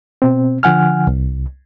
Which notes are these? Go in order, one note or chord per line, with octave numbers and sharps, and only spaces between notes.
B2 C4
D3 F3 F#5 G#5 F6
C2